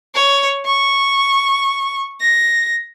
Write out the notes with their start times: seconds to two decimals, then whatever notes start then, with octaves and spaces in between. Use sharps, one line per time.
0.14 C#5
0.66 C#6
2.21 A#6